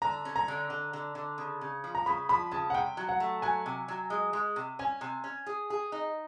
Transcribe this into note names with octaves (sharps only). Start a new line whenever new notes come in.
D3 A#5
C#4
A#5
D3
D3
D3
D3
C#3
C#3
F3
A#5
C#3 B5
F3 B5
C#3 A5
F#5
C3 G5
F#3
F#5
A3
F#3 G#5
C3
F#3
G#3
G#3
C3
C#4 G#5
C3
C#4
G#4
G#4
D#4